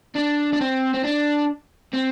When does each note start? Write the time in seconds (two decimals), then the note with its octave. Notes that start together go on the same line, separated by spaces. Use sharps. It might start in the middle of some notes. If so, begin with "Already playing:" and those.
0.15 D4
0.52 D4
0.60 C4
0.94 C4
1.04 D4
1.94 C4